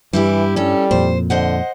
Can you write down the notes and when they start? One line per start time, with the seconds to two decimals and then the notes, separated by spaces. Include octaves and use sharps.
0.13 G2 E3 G3 E4 G4
0.56 G3 C#4 A4
0.91 F2 A#2 C5
1.30 D3 C5 D#5 F#5